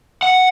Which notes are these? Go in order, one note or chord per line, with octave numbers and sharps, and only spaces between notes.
F#5